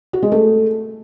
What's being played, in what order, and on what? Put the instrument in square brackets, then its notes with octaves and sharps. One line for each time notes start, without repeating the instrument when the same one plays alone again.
[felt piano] F#4
G#3
A3